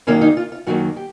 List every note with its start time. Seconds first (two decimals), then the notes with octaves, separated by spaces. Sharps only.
0.07 F#2 D#3 F#3 A#3 C#4
0.21 D#4
0.37 F4
0.52 F4
0.67 F#2 D#3 F#3 A#3 F#4
0.96 G4